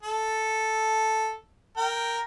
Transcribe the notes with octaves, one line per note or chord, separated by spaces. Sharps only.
A4
A#4 G5